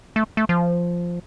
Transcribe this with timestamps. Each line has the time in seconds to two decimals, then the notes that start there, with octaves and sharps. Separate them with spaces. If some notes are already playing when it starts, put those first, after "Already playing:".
0.16 A3
0.37 A3
0.49 F3